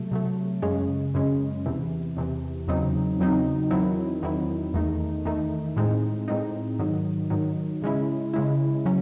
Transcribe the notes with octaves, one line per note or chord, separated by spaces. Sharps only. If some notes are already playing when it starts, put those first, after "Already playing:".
Already playing: C3 F#3 A3
C3 F#3 A3
F#2 C#3 G#3 C#4
F#2 C#3 G#3 C#4
E2 C3 E3
E2 C3 E3
E2 C#3 F#3 C4 D#4
E2 C#3 F#3 C4 D#4
E2 D#3 F#3 C4 E4
E2 D#3 F#3 C4 E4
E2 D#3 A3 D#4
E2 D#3 A3 D#4
A2 G#3 C4 D#4
A2 G#3 C4 D#4
G#2 D#3 F#3
G#2 D#3 F#3
C#3 G#3 C#4 E4
C#3 G#3 C#4 E4
C#3 F#3 C#4